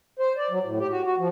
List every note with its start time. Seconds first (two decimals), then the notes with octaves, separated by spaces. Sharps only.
0.19 C5
0.37 D5
0.50 F#3
0.63 A2
0.79 G4
0.91 F#4
1.05 F#4
1.18 F3